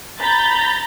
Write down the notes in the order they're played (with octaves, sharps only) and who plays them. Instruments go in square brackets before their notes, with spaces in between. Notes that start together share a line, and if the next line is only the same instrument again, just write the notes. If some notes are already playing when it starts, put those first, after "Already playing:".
[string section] A#5 B5 G6 A6